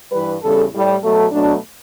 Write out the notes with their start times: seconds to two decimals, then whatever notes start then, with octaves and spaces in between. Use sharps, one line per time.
0.11 G2 E3 G3 B4
0.41 E2 C#3 G3 A4
0.71 A2 G3
1.02 B2 F#3 A3
1.31 B2 F#3 A3 D4